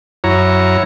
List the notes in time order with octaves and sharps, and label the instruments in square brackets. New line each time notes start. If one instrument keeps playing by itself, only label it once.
[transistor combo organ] F#2 A#5 [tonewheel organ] F#3 E4 C#5